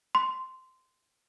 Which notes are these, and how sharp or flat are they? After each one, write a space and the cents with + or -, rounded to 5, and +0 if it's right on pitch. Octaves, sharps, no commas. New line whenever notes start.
C6 -10